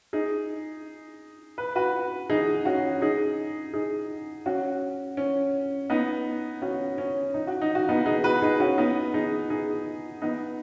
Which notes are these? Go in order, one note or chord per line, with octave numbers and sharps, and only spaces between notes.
D#4 G#4
B4
F#4 B4
D#4 G#4
C#4 F#4
D#4 G#4
D#4 G#4
C#4 F#4
C#4
B3 D#4
C#4 F#4
C#4
D#4
F#4
D#4
F#4
B3 D#4
B4
D#4 G#4
F#4 B4
D#4 G#4
C#4 F#4
B3 D#4
D#4 G#4
D#4 G#4
B3 D#4